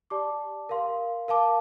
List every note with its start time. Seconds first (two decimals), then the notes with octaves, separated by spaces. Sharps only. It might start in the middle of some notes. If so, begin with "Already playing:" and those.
0.10 G4 D5 A5 D6
0.69 A#4 F5 C6
1.28 A#4 F5 A5 D6